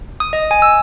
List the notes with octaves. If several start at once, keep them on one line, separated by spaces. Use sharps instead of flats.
D#6
D#5
G#5
E6